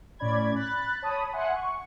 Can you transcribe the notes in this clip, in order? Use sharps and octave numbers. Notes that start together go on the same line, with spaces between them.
A2 C#4 D5 B5 G#6
B5 F#6 A6
C#5 A5 B5 D#6
E5 F#5 G#5 C6
C#6